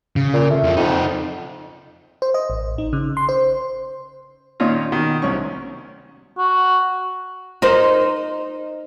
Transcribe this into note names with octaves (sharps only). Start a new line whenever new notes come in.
C#3
A#2
A3
F2 F3
F2 D#4 A4
C5
D#5
A1
D#4
C#3
C6
C5
A#2 D#3 C#4 D#4 F4
B2 D#3
C2 C#4 C#6
F#4
D#4 A#4 C5